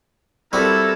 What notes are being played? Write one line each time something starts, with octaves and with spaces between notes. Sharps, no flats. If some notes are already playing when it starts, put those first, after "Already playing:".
G3 C4 E4 F#4 A4 A#4